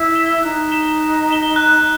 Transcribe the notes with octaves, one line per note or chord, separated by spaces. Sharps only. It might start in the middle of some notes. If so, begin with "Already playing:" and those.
Already playing: E4
B6 E7 G7
D#4 F#6
B6 E7 G7
F#6
B6 E7 G7
F#6